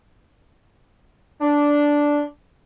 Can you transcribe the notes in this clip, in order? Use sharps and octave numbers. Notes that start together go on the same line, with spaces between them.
D4